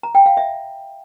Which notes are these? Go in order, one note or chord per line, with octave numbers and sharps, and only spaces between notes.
A#5
G5
F5
E5